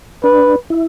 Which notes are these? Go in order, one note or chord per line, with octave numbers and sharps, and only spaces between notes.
D4 B4
E4